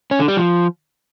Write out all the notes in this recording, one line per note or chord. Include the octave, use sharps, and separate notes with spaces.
C#4
D3
G3
F3